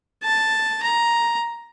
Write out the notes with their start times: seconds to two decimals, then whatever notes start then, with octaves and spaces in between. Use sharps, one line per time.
0.23 A5
0.83 A#5